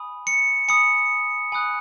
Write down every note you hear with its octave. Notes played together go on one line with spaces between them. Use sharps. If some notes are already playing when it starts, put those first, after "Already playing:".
Already playing: G#5 B5 D#6
C#7
G#5 B5 D#6 C#7
G#5 B5 D#6 F#6